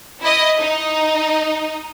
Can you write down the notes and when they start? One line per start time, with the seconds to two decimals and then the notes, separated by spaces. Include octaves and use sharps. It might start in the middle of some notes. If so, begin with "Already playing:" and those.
0.21 E4 D#5
0.59 D#4